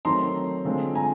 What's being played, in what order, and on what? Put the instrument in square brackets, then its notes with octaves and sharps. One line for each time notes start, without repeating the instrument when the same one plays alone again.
[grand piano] D#3 F#3 A3 C4 D#4 A#5 C6
D3 F3 G#3 C4 F4
G#5 A#5